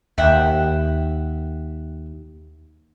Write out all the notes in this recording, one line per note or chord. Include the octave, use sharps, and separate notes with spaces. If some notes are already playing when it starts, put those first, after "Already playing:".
D#2 E5 F#5 G5